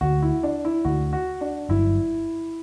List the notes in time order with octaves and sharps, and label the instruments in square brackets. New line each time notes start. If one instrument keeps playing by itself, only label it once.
[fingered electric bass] D2 D3 A3 [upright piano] F#4
[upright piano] E4
D4
E4
[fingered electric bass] D2 D3 A3 [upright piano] F#4
[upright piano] F#4
D4
[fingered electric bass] G1 G2 F#3 [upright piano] E4